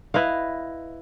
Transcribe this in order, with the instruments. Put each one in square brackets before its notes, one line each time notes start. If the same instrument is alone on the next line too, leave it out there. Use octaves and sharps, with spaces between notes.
[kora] E4 B4 D#5 F5